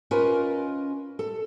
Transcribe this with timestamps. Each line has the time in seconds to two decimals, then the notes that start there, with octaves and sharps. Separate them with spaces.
0.11 C#4 F4 A#4 B4 D#5
1.19 A4